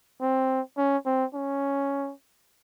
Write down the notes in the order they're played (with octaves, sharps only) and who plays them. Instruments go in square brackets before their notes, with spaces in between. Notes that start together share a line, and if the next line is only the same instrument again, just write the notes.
[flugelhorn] C4
C#4
C4
C#4